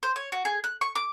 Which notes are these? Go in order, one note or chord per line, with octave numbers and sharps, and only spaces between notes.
C5
C#5
F#4
G#4
F#6
C#6
D6